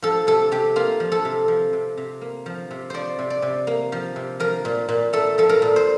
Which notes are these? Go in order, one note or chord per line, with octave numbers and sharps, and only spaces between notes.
F3 A4
C3 A4
C3 G4
A#3 F4
F3
A4
C3
F3
C3
C3
A#3
F3
C3
F3 C5 D5
C3
D5
C3
A#3
F3
C3
F3 A#4
A#2
A#2
A3 A4
F3 A4
A#4
A#2
C5